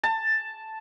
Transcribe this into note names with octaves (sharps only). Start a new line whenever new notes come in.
A5